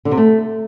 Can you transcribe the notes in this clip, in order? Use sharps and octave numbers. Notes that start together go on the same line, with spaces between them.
D3
C3
A3